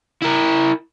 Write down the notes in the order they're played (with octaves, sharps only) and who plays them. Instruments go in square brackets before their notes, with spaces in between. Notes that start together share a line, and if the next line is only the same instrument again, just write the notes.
[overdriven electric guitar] E4 A#4